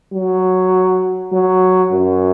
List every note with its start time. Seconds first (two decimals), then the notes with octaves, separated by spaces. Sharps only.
0.13 F#3
1.32 F#3
1.92 F#2